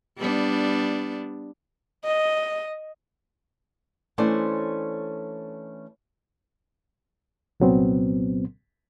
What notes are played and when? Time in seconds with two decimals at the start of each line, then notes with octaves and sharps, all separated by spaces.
0.19 G3 B3 D4
2.04 D#5
4.18 E3 A3 C#4 D4 C5 D5
7.60 C2 A#2 F#3 B3 C4